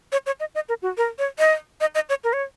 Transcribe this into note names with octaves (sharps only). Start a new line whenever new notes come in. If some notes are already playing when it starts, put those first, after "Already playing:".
C#5
C#5
D#5
D#5
A#4
F#4
A#4
C#5
D#5
D#5
D#5
C#5
A#4
C#5